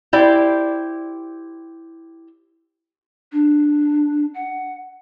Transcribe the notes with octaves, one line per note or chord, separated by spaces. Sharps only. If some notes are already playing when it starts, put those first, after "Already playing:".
E4 G4 C5 D5
D4
F#5